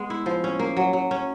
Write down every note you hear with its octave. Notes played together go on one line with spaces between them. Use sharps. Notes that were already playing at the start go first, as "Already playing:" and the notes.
Already playing: G#3 B3
E4
F3
C#4
A#3
F#3
F#3
C#4